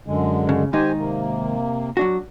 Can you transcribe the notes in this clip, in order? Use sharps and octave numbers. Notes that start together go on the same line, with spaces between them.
F#2 D3 G#3
C#3
G#2 D#3 D#4 G4 C5 G#5
C3 A#3
F#3 D4 F#4